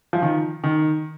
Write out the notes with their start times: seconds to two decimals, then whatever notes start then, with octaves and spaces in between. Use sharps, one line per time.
0.13 F3
0.22 D#3
0.64 D#3